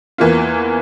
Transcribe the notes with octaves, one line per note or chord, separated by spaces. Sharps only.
E2 E3 A#3 F4